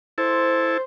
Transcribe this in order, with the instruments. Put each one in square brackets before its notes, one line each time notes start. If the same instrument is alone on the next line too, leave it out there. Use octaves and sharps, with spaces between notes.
[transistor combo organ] E4 A4 [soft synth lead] C5